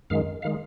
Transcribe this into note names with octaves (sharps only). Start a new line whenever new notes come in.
F#2 D#3 G#3 F5
D#3 G#3 F5